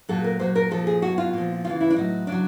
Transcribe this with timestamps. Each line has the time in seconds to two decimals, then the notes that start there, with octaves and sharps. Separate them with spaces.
0.09 A#2 F#3 A4
0.24 A#4
0.39 A#2 F#3 C5
0.56 A#4
0.71 A#2 F3 A4
0.87 G#4
1.02 B2 F#3 F#4
1.18 F4
1.33 A#2 F3
1.65 C#3 E3 F4
1.81 E4
1.90 D4
1.96 A2 F#3 D#4
2.27 C#3 F#3 D4